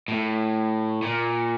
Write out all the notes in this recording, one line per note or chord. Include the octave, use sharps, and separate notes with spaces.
A2
A#2